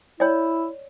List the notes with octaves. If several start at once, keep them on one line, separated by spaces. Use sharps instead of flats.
E4 C#5 D5